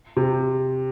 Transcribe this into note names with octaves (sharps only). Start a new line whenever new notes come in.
C3